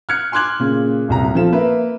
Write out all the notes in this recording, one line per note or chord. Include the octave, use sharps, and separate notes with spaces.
F6 F#6 G#6 C#7
G#5 C6 D6 F#6 G#6 F#7
A#2 C#3
D#1 C2 A#5
F3 C4 F4 A4 E7
A#3 A#4 B4 E5